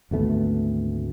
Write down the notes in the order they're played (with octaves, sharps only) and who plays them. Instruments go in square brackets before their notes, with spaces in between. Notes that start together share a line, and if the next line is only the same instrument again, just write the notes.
[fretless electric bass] G#1 D2 A3 B3